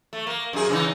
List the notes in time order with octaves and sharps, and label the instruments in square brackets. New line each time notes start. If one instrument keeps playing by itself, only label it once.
[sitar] A3
A#3
F#2 D#4 G#4
C#3 E3 D#4